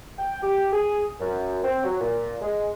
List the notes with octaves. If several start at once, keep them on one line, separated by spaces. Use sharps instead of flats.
G5
G4
G#4
F#2
C4
F#3
A#2
G#3